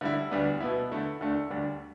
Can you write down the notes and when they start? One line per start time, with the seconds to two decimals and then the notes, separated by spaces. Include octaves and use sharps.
0.01 D3 G3 E4
0.31 D2 D3 G3 B3 D4
0.60 B2 B3 E4
0.91 D3 A3 E4
1.21 D2 D3 A3 D4
1.50 D2 D3 G3 D4